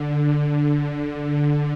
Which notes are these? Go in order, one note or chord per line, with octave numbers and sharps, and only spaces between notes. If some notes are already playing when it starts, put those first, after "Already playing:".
Already playing: D3